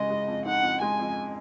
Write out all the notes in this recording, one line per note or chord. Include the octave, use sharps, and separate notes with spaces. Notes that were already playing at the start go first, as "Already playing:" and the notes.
Already playing: C#3 G#3 D#5
G#3
F2
D#4 F#5
F2
G#3 G#5
F2